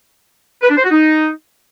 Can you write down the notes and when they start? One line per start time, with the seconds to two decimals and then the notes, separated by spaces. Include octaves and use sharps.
0.62 B4
0.70 D4
0.77 C5
0.84 F#4
0.91 D#4